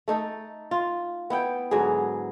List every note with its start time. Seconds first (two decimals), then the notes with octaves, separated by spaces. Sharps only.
0.08 A3 D#4 A4
0.71 F4
1.30 B3 E4 G5
1.71 G#2 D3 F#3 G#4